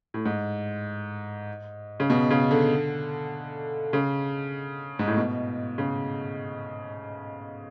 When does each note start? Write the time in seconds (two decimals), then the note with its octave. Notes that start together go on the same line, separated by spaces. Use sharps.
0.14 A2
0.25 G#2
2.00 C#3
2.10 B2
2.31 C#3
2.51 D3
3.93 C#3
4.99 G#2
5.07 A2
5.17 B2
5.78 C#3